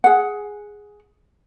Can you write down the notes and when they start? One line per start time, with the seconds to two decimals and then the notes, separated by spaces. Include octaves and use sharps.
0.04 G#4 F#5